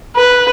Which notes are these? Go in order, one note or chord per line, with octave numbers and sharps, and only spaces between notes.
B4